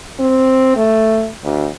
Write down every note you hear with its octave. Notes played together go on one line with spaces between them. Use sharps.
C4
A3
D2